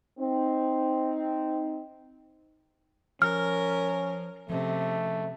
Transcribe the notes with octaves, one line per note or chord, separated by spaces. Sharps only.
C4 D#4
F3 C#4 A#4 F6
C3 F3 A3 C#4